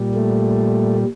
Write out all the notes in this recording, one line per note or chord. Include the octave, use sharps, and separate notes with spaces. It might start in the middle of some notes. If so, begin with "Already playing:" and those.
Already playing: A#2 G3
A3